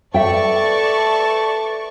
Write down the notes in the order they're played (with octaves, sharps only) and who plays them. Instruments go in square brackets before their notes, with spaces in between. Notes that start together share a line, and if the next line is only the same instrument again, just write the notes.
[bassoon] A3 [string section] B4 D5 C#6 [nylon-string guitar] E5 G5 [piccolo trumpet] A5